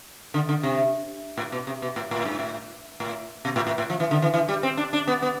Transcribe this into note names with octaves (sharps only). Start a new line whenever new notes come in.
D3
D3
C3
A2
B2
C3
B2
A2
A2
G2
A2
A2
B2
A2
A2
A2
F3
E3
D3
E3
E3
G3
C4
D4
D4
B3
B3